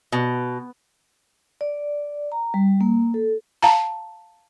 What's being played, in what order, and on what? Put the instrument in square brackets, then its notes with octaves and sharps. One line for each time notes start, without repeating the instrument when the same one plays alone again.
[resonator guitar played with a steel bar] B2
[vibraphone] D5
A#5
G3
A#3
A4
[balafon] F5 A5 A#5